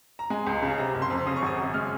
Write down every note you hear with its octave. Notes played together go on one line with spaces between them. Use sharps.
A#5
G#3 G#5
C#2
C#3
C3 A#5
F#1
C6
F2
C#3 D#6
C#6
G#1 D#6
F#2
G#3 F6